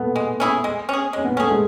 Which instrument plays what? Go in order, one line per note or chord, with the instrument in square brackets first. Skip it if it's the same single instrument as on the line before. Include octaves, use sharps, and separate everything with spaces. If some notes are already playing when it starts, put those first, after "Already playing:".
Already playing: [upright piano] A3 B3
[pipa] G#3
C#4 E4 G#4
G#3
C#4 G#4
[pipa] G#3 [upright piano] C#4
[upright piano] B3
[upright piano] A3 [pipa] C#4 G#4
[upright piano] G#3